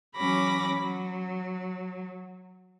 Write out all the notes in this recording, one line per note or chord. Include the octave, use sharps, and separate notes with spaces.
E3 F#3 C#4 B5 D6 A#6
F#3